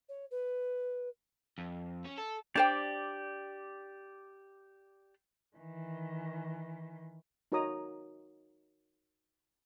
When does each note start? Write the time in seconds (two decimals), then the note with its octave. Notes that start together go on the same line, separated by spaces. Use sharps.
0.09 C#5
0.31 B4
1.58 F2
2.05 C#4
2.18 A4
2.55 D4 G4 C5 D5 G5
5.57 D#3 E3
7.52 D#4 F#4 A#4 C#5 A#5 D#6